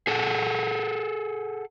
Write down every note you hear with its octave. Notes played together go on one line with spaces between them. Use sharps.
G#4 A4 F#5